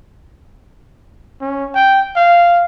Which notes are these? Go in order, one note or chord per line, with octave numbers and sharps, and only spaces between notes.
C#4
G5
F5